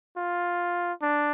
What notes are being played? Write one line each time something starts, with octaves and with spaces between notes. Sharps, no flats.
F4
D4